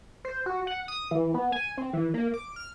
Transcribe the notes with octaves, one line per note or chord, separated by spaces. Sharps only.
C5
F#4
F#5
D#6
E3
B3
G#5
C4
E3
A#3
D6
F6